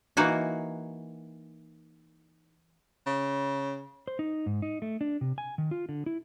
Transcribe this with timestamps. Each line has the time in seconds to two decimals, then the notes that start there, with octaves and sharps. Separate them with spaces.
0.17 E3 A#3 D#4 F#4 G#5
3.06 C#3
4.08 C5
4.19 D#4
4.46 G#2
4.62 D#4
4.82 A3
5.01 D4
5.21 C3
5.38 G#5
5.58 D#3
5.71 F4
5.89 D3
6.06 E4